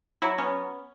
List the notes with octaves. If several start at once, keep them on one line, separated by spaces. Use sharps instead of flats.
F#3 E4
B3 C#4